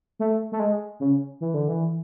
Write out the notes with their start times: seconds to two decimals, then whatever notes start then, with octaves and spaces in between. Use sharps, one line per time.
0.19 A3
0.52 A3
0.60 G#3
1.00 C#3
1.41 E3
1.54 D3
1.69 E3